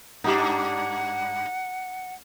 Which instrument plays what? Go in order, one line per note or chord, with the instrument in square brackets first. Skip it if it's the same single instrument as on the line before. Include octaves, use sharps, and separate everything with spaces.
[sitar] G2 D4 [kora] D#4 G4 [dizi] F#5